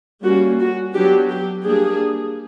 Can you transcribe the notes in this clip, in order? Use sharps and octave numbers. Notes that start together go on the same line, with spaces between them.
G3 A#3 C#4 F#4
F#4
F#3 B3 D4 G4
G4
G3 A#3 D4 G#4